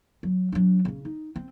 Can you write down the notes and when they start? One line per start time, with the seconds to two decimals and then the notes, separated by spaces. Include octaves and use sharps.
0.23 F#3
0.52 F#3 D4
0.85 C#3 C#4
1.05 D#4
1.36 C4